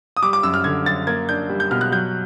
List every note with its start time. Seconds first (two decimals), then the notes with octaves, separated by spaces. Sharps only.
0.17 D#6
0.22 G3 D6
0.33 D6
0.43 F#2 E6
0.54 F6
0.64 D3 G#6
0.86 F#2 A6
1.07 A#3 G#6
1.29 D4 G6
1.49 G3
1.60 G6
1.71 B2 F6
1.81 F#6
1.92 F#3 G6